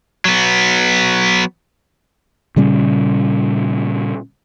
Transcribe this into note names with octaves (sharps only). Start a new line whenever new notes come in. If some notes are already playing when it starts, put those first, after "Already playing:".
F#3 B3
A#2 C#3 G3 C#4